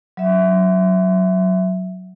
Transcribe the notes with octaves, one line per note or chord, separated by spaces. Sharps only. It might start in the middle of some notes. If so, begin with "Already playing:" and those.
F#3 E5